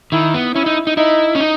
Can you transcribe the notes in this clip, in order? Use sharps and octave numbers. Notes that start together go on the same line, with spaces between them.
D#3 E4
B3
C#4 E4
D#4
D#4
D#4 E4
C#4
D#4